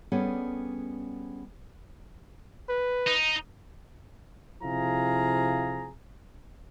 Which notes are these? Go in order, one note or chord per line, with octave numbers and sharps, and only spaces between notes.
G3 B3 C#4 D4 G#4 A4
B4
D#4
C3 F3 E4 G#4 F5 A#5